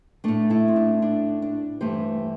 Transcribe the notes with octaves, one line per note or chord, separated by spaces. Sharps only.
A2 A3 D4
E4 A4
C4
D4
D4
D4
G2 E3 A3 G4 C5